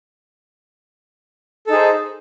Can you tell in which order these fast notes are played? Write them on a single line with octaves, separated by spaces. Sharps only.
A4 D#4 G#4 C5